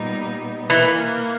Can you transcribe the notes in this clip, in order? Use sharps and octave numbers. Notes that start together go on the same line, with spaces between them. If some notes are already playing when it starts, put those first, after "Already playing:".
Already playing: A#2 G3 B3 D#4
E3 A#3